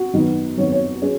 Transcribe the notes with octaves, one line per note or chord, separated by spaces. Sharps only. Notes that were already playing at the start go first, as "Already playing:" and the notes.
Already playing: F#4
F#2 D#3 B3
F#2 D#3 B3 C#5
C#5
F#3 C#4 G#4